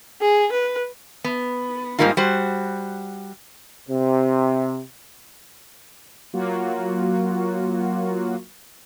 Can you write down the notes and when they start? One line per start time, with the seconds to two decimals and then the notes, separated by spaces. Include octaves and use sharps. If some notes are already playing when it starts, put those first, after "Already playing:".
0.21 G#4
0.52 B4
1.24 B3
1.99 G#2 C#3 G3 A#3 D#4 F4
2.17 G3 F#4 C5
3.89 C3
6.33 F#3 A#3 F4 F#4